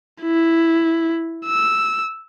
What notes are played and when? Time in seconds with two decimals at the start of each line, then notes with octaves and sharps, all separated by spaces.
0.23 E4
1.46 E6